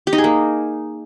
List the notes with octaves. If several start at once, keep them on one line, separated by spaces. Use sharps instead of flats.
G4
D#4
G#4
A#3